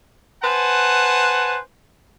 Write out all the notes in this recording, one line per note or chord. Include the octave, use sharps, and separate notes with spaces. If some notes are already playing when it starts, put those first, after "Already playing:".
B4 C5 F#5 G#5 A5